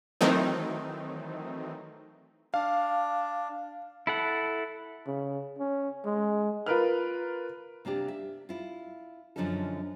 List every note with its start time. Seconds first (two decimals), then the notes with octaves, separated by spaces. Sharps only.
0.21 D#3 E3 F#3 A3 C4 D#4
2.54 D4 F5
4.07 E4 A4 F#5
5.07 C#3
5.59 C#4
6.05 G#3
6.66 F4 A#4 B4 F6
7.85 C3 A#3 D4 G4
8.08 E5
8.49 E4 F4
9.36 F#2 D3 F3 C#4 D#4 A4